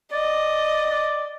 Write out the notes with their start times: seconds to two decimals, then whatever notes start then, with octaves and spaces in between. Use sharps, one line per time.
0.12 D5 D#5
0.91 D5